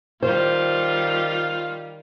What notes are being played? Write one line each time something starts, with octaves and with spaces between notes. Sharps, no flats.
D#3 G3 F4 C5